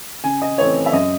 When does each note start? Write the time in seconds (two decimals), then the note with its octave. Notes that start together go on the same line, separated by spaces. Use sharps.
0.24 C#3 G#5
0.42 D#5
0.58 E3 A3 C4 C#5
0.86 E5
0.93 F#2 D#5